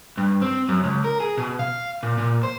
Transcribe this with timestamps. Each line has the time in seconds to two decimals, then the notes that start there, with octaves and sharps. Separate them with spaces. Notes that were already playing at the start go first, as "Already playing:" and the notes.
0.17 G2
0.41 C4
0.69 F#2
0.84 C#2
1.04 A#4
1.20 G#4
1.37 B2
1.59 F5
2.03 A#2
2.18 A#2
2.43 C5